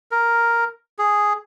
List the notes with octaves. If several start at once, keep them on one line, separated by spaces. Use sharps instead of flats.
A#4
G#4